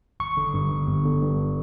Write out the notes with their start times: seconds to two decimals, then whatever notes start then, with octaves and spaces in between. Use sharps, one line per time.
0.20 G1 C#6
0.37 D3
0.54 G2
0.71 G1
0.87 G1
1.05 D3
1.22 G2